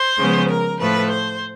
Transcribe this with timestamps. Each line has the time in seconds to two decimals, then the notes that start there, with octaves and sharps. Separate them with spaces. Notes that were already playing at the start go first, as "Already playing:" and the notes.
Already playing: C5
0.18 C#3 F3 G#3 B3
0.49 A#4
0.79 A2 F3 A3 B4
1.10 C5